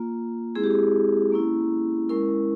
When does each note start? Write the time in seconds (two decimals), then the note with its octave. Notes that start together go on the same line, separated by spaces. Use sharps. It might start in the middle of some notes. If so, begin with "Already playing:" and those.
Already playing: A#3 F4
0.56 G#3 C4 E4 G#4
0.64 G4
0.71 G#4
1.32 A#3 C#4 E4
2.09 G#3 C#4 E4 A#4